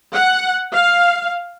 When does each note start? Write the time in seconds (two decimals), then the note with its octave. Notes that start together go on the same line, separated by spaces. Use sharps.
0.14 F#5
0.73 F5